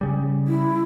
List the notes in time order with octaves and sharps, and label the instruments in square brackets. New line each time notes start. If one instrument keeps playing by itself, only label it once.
[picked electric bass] C#3 G3
[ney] E4